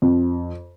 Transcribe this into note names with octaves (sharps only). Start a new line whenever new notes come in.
F2